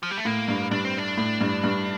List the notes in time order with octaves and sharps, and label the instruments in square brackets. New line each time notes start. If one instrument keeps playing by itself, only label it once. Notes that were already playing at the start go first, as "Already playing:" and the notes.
[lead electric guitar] F3
G3
A3
[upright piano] A2 [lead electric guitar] A#3
[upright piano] G2
[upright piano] G2 [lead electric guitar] D4
[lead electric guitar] C4
D4
[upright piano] A2
G2
G2